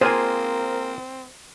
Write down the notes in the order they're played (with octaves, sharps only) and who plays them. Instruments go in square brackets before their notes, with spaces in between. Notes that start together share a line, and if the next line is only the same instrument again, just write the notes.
[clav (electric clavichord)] A#3 F4 G#4 [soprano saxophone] C4 [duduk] A#4 [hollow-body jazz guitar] C5 G#5